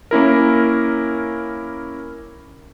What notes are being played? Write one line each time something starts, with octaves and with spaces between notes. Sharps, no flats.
A#3 C#4 E4 A#4